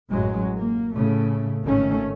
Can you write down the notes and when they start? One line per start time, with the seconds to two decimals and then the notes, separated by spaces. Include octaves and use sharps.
0.11 A1 F#2 F#3 G#3
0.57 A#3
0.94 A2 C#3 A3
1.65 G#1 D#3 A3 C#4